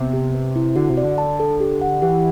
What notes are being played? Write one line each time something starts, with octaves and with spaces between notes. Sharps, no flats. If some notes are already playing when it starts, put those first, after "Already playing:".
Already playing: C3 B3
G4
B4
E4
D3 F#4
C3
D5
D3
A5
A4
G4
F#5
E3 G4